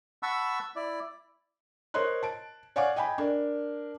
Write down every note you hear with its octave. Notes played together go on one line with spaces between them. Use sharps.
F#5 A5 B5 C#6 E6
E4 D5
A#4 C5 C#5 D#5 C6 F#6
A5 D7
C#5 D5 F5 F#5 G#5 D6
D#5 G5 G#5 B5
D4 A#4